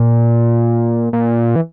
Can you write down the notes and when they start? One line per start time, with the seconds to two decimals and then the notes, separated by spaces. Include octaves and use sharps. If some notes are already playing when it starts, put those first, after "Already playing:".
Already playing: A#2
1.13 A#2
1.56 E3